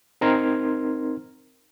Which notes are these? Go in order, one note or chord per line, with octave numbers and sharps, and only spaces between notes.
C4 D#4 A#4 C6 F6 G#6